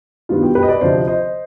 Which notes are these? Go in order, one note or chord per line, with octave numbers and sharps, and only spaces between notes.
G2 D#3 G3 B3 F4
G4
G4 B4
D#5
B4 D5
D2 C3 F3 C5 D#5
C5 D#5